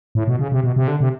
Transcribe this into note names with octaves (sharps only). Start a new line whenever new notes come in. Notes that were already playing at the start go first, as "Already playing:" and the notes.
A2
B2
C#3
C3
B2
C3
D3
C3